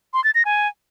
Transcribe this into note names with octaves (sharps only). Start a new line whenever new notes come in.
C6
A6
A#6
G#5